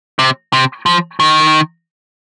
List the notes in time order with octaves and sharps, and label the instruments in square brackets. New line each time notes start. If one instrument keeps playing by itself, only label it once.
[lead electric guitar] C3
C3
F3
D#3